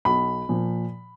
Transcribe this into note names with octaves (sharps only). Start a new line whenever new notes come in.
B1 B5
A#2 F3